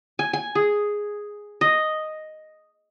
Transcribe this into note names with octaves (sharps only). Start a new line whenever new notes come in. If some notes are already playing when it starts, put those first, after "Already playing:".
G#5
G#5
G#4
D#5